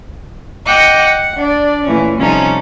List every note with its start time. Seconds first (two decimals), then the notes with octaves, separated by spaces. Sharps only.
0.67 D#5 F#5 G5 D6 E6
0.98 F#5
1.37 D4 D5
1.85 A#2 E3 A3 C#4
2.18 C3 F3 G3 C#4 D#4 A4